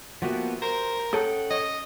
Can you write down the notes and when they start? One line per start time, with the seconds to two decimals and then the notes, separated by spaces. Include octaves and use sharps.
0.22 F3 A#3 B3 F#4 G4 E5
0.62 A#4 C5
1.13 C#4 A4 F#5 G5 D#6
1.50 C#5 D#5